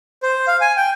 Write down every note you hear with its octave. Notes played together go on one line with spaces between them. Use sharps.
C5
F5
G#5
G5